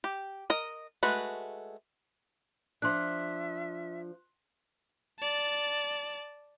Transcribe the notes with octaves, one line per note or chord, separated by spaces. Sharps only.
G4
A#4 D#5
G#3 A3 F#4 B4
F3 D4 E5 C6 F#6
D5 A5